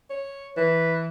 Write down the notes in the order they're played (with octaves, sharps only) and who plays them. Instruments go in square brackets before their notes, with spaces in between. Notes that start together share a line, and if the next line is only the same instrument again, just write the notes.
[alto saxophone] C#5
[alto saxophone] E3 [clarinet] B4